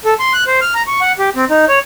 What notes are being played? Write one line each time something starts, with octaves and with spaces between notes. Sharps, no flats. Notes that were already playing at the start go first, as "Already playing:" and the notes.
A4
C6
F#6
C5
F6
A#5
C#6
F#5
G4
C4
D#4
C#5